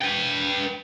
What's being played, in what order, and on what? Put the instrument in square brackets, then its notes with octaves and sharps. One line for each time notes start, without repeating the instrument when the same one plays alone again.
[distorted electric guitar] B4 G5